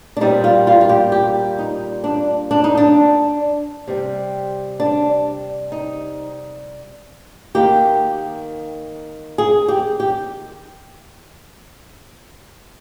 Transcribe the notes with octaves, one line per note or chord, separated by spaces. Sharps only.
D4
A#2 G3 C4 D#4
F4
F4
F4
G4
G4
D#4
D4
D4
D#4
D4
C3 G3 C4
D4
D#4
D#3 A#3 G4
G#4
G4
G4